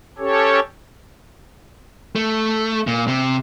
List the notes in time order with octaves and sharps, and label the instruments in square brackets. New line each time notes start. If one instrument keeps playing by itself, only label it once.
[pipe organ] C#4 G4 A4 C#5
[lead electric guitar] A3
A#2
C3